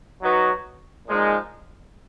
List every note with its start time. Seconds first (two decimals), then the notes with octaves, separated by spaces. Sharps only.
0.22 F#3 B3 D#4 F#4
1.07 A#2 F3 G#3 D#4